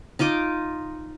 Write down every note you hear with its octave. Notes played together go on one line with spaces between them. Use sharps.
D#4 F4 D#5 D6